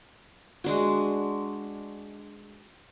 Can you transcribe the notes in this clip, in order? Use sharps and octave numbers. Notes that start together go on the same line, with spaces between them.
G#3 D4 F#4